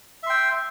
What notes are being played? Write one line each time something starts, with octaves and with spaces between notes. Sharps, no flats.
E5 G5 C6